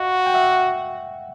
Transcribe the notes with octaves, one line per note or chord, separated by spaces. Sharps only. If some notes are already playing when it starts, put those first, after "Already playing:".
Already playing: F#4 D#5 F5
G5
E5 F#5